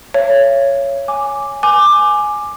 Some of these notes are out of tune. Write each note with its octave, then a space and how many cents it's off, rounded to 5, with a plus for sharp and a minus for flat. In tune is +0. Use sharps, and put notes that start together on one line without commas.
C#5 +0 E5 +45
G#5 +0 D6 +0
G#5 +10 D6 +15